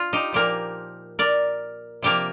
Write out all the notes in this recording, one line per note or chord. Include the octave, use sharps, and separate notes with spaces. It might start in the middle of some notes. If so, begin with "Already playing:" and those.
Already playing: F4
D#4 G4
A#2 F3 A#3 G4 A#4
A#4 D5
C3 F3 A#3 G4 A#4